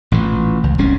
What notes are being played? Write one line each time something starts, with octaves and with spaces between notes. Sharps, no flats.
A1 A#2 E3
C#2
F1 C2 G#2 C#4